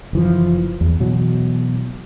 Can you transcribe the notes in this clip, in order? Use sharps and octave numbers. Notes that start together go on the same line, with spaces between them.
F#1 E3 F3
E2
B2 E3 F#3